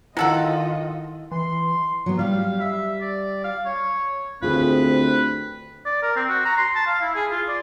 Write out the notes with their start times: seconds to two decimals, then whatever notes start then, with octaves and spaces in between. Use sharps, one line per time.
0.17 D#3 F#3 E4 F4 A4 D#5 F#5
1.32 E3 C6
2.06 F#3 B3
2.19 G3 G4 F5
2.60 E5
3.01 D5
3.44 F5
3.66 C#5
4.43 D2 C4 F4 G#4 B4
5.85 D5
6.03 A#4
6.16 C4
6.29 F#4
6.45 A#5
6.58 C6
6.75 A5
6.87 F5
7.02 E4
7.15 G#4
7.31 F4
7.48 D5